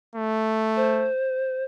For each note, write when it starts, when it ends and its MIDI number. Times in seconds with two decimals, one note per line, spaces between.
0.15 1.10 57
0.76 1.64 72